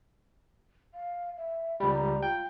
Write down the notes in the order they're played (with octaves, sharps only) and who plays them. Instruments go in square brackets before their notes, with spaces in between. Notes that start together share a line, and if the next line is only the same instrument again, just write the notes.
[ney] F5
E5
[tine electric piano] C#2 G3 [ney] B5
[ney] A#5
[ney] F4 [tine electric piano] G5